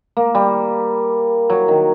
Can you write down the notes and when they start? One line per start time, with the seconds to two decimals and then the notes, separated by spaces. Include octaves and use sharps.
0.17 A#3
0.35 G3
1.50 F#3
1.68 D#3